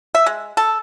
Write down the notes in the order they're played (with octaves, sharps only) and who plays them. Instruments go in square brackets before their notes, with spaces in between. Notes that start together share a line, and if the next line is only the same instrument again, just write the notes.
[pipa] E5
G#3
A4